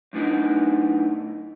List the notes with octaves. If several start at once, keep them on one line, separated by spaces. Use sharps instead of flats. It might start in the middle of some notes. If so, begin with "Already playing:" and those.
F#2 A2 B3 D4 D#4